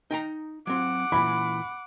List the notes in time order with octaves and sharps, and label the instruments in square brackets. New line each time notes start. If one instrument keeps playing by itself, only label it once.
[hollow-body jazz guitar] D#4 G5 A#5
[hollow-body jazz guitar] F#3 C4 [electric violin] F#5 D6
[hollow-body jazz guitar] A#2 E3 [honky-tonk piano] B5